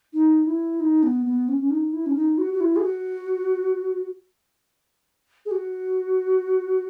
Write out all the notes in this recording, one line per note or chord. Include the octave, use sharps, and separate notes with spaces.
D#4
E4
D#4
B3
B3
C#4
C#4
D#4
E4
C#4
D#4
F#4
F#4
E4
G#4
F#4
G#4
F#4